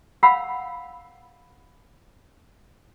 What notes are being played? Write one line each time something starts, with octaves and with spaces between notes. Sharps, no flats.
F5 F#5 B5 E6